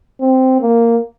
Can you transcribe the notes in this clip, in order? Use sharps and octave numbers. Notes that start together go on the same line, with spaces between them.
C4
A#3